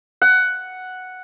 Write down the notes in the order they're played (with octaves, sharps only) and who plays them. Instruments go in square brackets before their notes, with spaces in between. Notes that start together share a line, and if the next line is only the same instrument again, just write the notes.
[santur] F#5